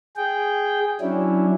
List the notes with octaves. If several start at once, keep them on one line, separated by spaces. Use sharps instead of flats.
G#4 G5
F#3 C#4 D4 E4